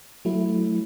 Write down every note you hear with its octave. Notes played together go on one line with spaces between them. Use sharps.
F#3 A3 E4